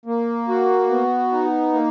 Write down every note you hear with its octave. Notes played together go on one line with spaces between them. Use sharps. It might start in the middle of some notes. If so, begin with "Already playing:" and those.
A#3
F#4
B3
D#4
A#3